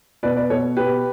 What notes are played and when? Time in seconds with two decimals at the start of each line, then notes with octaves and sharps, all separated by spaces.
0.23 B2 B4 D5
0.36 B4 D5
0.50 B2 A4 C#5
0.77 B2 G4 B4